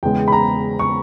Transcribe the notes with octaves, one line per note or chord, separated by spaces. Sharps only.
E2 C#3 G#3 B3 G5
B5
A#5
C#6